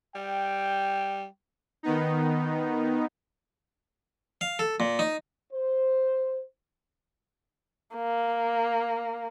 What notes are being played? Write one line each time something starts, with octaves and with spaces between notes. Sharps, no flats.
G3 G5
D#3 B3 D#4
F5
A4
A#2
D#4
C5
A#3